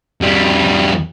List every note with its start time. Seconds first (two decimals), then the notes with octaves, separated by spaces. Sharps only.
0.21 F2 G3